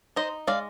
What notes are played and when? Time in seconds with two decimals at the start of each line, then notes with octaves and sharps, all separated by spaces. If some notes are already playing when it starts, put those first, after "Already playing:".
0.16 D#4 C5 D#5
0.47 G#3 D5 F5